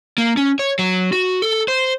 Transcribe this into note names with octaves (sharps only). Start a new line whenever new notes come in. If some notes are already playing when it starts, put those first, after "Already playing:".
A#3
C#4
C#5
F#3
F#4
A4
C5